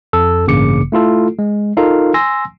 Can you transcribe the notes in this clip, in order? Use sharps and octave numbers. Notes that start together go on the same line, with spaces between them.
F2 A4 E6
A1 G2 C#3 A#3 D6 C#7
A3 E4 F4 A4
G#3
D#4 F4 A4 A#4 F5
G#5 C6 E6 A#6